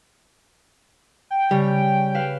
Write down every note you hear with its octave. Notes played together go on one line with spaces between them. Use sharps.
G5
C#3 G3 C#5
B4 F5 E7